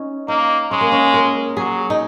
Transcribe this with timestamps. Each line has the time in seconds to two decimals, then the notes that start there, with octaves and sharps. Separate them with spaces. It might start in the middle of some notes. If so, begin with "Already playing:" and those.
Already playing: C#4 D#4
0.28 A#3 D#4
0.71 G#3 C#4
0.81 A#3
0.92 C#4
1.14 A#4
1.57 F#3 G#4
1.90 D#4